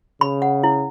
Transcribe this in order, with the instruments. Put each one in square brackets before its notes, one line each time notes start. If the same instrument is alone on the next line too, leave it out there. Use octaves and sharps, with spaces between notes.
[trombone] C#3 [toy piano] B5
[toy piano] F#5
E4